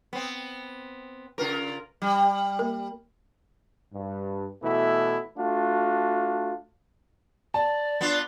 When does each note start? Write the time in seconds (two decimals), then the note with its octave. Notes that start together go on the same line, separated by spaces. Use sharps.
0.13 B3 C4
1.38 C#3 F4 A#4 B4
2.02 G3
2.59 A#3 A#4
3.93 G2
4.62 B2 E3 A3 E4
5.38 A3 D4 F4 F#4
7.54 D5 A5
8.01 B3 D4 F4